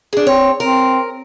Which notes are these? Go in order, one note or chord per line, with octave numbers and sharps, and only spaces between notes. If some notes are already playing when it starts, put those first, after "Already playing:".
D4 G#4
C4 C#5
C4 A#4